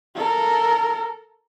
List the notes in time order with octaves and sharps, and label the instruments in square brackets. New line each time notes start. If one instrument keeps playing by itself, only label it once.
[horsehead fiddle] A4 A#4